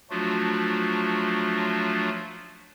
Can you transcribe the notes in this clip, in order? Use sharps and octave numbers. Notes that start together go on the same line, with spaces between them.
F3 F#3 A3 D4 F4 F#4